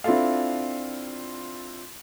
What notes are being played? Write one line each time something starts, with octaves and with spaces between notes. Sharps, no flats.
C4 D4 E4 F4 A4 F5